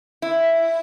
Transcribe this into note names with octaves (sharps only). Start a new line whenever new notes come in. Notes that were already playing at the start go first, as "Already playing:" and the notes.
E4